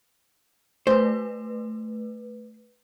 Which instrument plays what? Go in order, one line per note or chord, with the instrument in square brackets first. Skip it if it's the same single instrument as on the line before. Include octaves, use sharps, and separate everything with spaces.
[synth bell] A3 B4 [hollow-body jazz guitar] C5